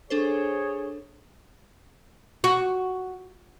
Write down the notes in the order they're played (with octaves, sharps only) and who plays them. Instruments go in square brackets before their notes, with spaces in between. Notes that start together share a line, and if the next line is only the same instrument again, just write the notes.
[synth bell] D4 A4 C5 [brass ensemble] G#4 C#5
[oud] F#4